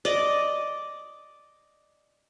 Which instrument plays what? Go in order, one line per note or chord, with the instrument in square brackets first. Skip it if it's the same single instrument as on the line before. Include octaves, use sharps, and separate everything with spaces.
[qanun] D5 D#5